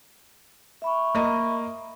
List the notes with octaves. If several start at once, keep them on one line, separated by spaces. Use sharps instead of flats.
E5 B5 C#6
A#3 D#5